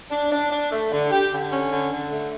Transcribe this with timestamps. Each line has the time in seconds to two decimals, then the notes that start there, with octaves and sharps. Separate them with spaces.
0.10 D4
0.31 D4
0.50 D4
0.70 A3
0.91 D3
1.11 G4
1.31 D3
1.51 C#4
1.72 D3
1.91 D3
2.12 A3